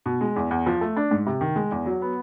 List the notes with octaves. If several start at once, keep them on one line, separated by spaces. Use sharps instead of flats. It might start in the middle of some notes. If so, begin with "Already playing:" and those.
B2
G#3
E2
E2
F3
A3
D4
G#2
C3
D#3
G#3
E2
F#3
B3